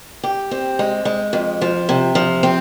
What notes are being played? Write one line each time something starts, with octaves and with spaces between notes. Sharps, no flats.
G4
C4
G#3
G#3
F2
F3
C3
F3
C4